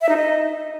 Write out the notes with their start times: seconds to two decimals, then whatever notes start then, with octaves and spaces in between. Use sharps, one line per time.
0.01 E5
0.09 D#4
0.17 D#5